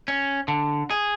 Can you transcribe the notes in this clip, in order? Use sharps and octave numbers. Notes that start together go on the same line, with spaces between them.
C#4
D3
G#4